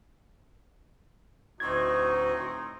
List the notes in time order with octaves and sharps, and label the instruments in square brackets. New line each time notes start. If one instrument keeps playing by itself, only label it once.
[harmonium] D2 F#4 [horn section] A2 C4 D#4 [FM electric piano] G#6